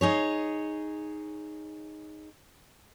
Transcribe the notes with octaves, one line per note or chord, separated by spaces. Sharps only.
D#4 G#4 C#5